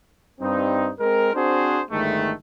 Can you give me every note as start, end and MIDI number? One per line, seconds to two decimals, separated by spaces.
0.41 0.91 43
0.41 0.91 55
0.41 0.91 60
0.41 0.91 63
1.00 1.33 56
1.00 1.33 60
1.00 1.33 70
1.34 1.82 60
1.34 1.82 62
1.34 1.82 66
1.34 1.82 68
1.34 1.82 72
1.90 2.32 31
1.90 2.32 51
1.90 2.32 56
1.90 2.32 57